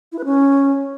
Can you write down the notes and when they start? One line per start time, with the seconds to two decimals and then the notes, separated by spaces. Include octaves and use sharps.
0.12 E4
0.18 B4
0.25 C#4